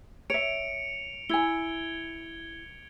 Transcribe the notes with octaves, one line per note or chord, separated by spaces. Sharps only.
C#5 E5 C#7 D7 F7
E4 G#5 G#6 G7